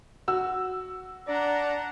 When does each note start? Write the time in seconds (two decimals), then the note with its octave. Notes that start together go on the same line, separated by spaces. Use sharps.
0.28 F#4 E6
1.28 D4 D5 F#5 A#5